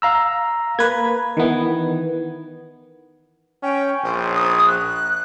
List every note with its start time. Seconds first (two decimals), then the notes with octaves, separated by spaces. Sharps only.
0.02 F5 A#5 E6
0.79 A#3 B4 G#6
1.37 D#3 E3 B3
3.63 C#4 G5
4.04 A#1 C5
4.34 D#6
4.68 F#6